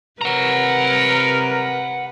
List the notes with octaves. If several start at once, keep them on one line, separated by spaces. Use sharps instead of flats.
C3 A#4 B4 F#5 A#5